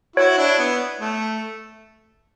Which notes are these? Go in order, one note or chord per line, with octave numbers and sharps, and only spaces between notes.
E4 F#4 C#5
D4 E4
B3
A3